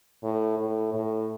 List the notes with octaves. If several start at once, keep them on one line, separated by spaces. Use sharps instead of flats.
A2
A2
A2